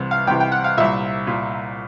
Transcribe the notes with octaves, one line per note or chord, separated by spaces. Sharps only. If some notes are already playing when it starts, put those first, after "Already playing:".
Already playing: C2 C3 E3
F5
C2 C3 E3 G5
G5
F#5
F5
C2 A#2 E5
A#2